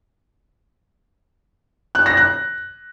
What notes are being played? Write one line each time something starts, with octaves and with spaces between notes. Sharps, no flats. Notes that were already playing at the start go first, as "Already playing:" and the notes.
F#6
A#6
F#6